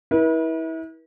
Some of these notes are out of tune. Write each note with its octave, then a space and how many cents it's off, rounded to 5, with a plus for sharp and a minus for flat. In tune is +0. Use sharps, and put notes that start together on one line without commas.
E4 -30 B4 -40